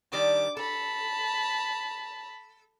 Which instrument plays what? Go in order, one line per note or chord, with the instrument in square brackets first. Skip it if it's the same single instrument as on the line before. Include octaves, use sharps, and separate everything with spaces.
[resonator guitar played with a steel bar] D#3 G3 D4 [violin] D6
[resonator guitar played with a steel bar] A4 [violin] A5 B5